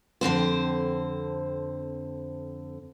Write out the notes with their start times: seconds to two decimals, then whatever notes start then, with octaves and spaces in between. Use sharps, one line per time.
0.21 F2 D3 C4 C5